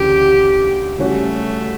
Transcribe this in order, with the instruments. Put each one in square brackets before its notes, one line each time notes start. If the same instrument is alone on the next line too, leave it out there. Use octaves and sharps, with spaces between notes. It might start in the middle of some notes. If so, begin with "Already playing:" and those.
Already playing: [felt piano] D2 C#3 E3 [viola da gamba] G4
[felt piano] C#3 G3 C#4 F#4 [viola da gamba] A3